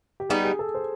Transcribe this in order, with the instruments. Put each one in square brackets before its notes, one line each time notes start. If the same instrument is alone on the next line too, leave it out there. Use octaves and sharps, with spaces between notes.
[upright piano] G4
[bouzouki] G3 B3 D#4 [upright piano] G#4
[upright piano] G#4
A4
C5